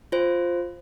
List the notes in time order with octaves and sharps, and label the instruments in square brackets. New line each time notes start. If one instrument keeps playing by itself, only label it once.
[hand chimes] F4 C5